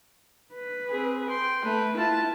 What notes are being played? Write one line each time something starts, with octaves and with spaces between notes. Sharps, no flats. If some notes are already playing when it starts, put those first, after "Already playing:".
B4
C4 G#4
G5 C6
A3 B4
E4 F4 A5